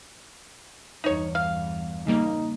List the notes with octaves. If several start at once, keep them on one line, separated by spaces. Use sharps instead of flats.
E2 G2 D#4 C#5
F5
C#3 G3 A#3 D#4